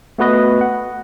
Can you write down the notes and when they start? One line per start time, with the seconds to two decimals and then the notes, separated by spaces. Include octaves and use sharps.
0.18 A3 B3 F#4 B4 D#5
0.61 F#5